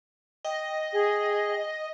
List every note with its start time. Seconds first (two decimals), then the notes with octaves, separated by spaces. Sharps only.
0.45 D#5 G5
0.93 G#4